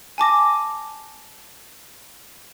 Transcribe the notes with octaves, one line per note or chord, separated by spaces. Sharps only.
G#5 A5 D6 A#6